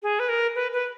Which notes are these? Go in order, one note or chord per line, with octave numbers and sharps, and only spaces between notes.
G#4
B4
A#4
B4
B4